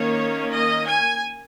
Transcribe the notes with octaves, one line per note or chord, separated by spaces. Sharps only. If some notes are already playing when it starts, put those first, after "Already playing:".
Already playing: D#3 A#3 C#4 C#5
D#5
G#5